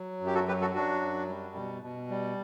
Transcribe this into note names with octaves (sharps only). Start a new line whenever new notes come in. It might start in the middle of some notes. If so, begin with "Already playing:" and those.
Already playing: F#3
F#2
G4
F#4 A4
F#3 G4 B4
F#4 A4
F#3 D4 F#4
F#2
G3
B2
B2
G3